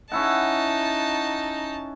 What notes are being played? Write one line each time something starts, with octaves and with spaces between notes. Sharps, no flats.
C#4 D#4 E4 F#5 A5